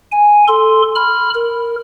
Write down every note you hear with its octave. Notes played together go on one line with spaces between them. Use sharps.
G#5
A4 C6
B5 F6
A#4